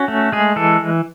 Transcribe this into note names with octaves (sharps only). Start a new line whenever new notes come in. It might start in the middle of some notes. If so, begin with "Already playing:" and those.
Already playing: C#4 F#4
A3
G#3 G#4
E3 A4